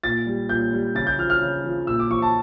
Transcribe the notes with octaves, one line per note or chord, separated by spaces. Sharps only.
A#2 A6
G3
A#2 G6
G3
C#3 A6
G6
F3 F6
F6
C#3
F3
A#2 E6
D6
F3 C#6
A5